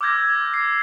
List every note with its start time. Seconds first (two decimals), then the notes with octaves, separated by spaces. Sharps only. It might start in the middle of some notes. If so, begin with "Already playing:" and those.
0.01 D6 E6 F6 G6 G#6 A#6
0.54 C7